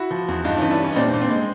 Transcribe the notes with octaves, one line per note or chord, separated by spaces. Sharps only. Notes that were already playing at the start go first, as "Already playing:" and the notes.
Already playing: E4 F#4
F3
E2
G2 D#4 F4
E3 C#4 D#4
D4 E4
G3
C#4
D#4
A#2 C4 D4
A#2
C4
G#3